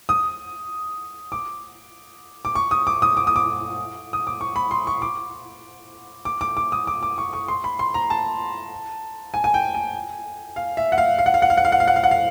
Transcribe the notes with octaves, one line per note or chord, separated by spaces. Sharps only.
D#6
D6
D6
C#6
D#6
D6
D#6
D6
D#6
D6
D#6
D6
C#6
B5
C6
C#6
D6
D6
D6
D6
D#6
D6
D6
C#6
C#6
C6
B5
C6
A#5
A5
G#5
G#5
G5
G#5
F5
E5
F#5
F5
F5
F#5
F5
F#5
F5
F#5
F5
F#5
F5
F#5
F5
F#5
F5